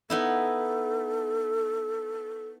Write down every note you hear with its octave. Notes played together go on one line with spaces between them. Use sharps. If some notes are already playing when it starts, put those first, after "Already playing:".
B3 D#4 E4 A4